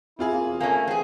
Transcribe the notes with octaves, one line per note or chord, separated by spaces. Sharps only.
C4 E4 F4 G#4
A#3
E2 B2
A3 A#3 C#4 G#5
E3 C4 G#4